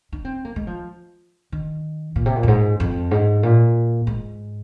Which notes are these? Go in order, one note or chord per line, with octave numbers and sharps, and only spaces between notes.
D#4
C4
A#3
G#3
F3
D#3
A#2
C3
A#2
F2
G#2
F2
G#2
A#2
G#2